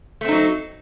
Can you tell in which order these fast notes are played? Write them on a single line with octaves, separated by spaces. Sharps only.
A3 C4 D#4 F#3